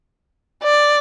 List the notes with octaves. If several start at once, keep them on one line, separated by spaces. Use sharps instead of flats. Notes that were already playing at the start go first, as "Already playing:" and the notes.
D5